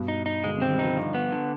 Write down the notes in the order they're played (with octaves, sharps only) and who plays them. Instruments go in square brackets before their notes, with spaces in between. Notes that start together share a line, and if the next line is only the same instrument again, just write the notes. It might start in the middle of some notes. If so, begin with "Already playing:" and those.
Already playing: [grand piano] G2 B2
[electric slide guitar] D#4
D#4
[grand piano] B2 D3 [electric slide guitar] G#3
[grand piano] C3 D#3
[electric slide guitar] C4
[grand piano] D#3 G3
[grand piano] D3 F3 [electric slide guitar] D#4
[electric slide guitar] G2
B3
D3